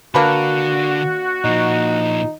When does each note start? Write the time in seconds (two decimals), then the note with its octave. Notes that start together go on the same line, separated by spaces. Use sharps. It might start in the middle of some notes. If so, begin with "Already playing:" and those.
0.15 D3 A#3 D4 F#4 B4
1.44 A#2 F3 D#4